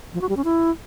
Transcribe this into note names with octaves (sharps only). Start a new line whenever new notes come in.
F3
F#4
G3
C#4
E4